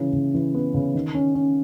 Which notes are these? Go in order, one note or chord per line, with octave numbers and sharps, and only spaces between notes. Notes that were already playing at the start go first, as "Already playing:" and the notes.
Already playing: C#3 E3
C#3
E3
B3
C#3
D#3
C#4
C#4